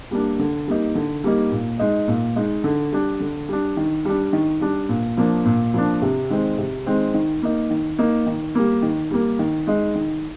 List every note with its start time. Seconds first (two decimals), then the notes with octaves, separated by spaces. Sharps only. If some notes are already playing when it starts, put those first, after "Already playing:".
0.11 G3 A#3 D4
0.39 D3
0.67 G3 A#3 D#4
0.95 D3
1.24 G3 A#3 D#4
1.51 A#2
1.79 G#3 D#4
2.08 A#2
2.36 G#3 D#4
2.64 D3
2.92 G3 D4
3.20 D3
3.48 G3 D4
3.77 D#3
4.05 G3 D4
4.33 D#3
4.61 G3 D4
4.89 A#2
5.17 F3 A#3 D4
5.45 A#2
5.74 F3 A#3 D4
6.02 C3
6.30 D#3 G#3 C4
6.58 C3
6.86 D#3 G#3 C4
7.14 D#3
7.42 A#3 D#4
7.70 D#3
7.98 A#3 D#4
8.27 D#3
8.55 G3 A#3
8.82 D#3
9.11 G3 A#3
9.39 D#3
9.67 G#3 D#4
9.95 D#3